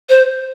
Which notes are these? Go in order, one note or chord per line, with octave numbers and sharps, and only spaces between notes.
C5